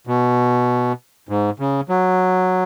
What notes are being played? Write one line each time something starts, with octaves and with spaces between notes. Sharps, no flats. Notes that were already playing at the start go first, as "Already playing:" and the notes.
B2
G#2
C#3
F#3